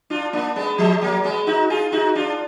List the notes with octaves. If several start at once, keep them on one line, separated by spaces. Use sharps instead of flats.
D4 F4
A#3 D4
G#3 B3
F3 G#3
F#3 A#3
G#3 B3
D#4 F#4
F4 G#4
D#4 F#4
D4 F4